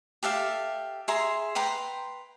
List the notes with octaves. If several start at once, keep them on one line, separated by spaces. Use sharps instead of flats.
G4 A4 E5 F5
G#4 E5 A#5 C6
B4 G5 A#5 C6